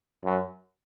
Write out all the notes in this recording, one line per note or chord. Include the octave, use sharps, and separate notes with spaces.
F#2